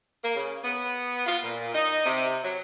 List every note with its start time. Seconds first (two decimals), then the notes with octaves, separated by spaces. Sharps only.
0.23 A#3
0.36 C#3
0.63 B3
1.26 F4
1.43 A#2
1.74 D#4
2.05 C3
2.43 F#3